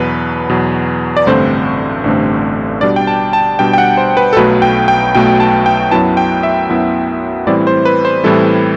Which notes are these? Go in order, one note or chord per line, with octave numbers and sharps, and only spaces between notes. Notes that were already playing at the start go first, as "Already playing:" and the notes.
Already playing: E2 B2 F#3 B4
E2 B2 F#3
D5
A1 G2 D3 A3 C4 C5
A1 G2 D3 A3 C4
B2 G3 D4 D5
G5
A5
A5
B2 G3 D4 G5
G5
F#5
C5
B4
A4
B1 B2 F#3 A3 B4
G5
G5
B1 B2 F#3 A3 G5
A5
G5
F#2 F#3 B3 E4 A5
G5
E5
F#2 F#3 B3 E4
A2 E3 G3 C4 E4 D5
C5
B4
C5
A2 E3 G3 C4 E4 A4